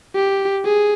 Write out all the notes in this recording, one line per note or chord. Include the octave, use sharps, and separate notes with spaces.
G4
G#4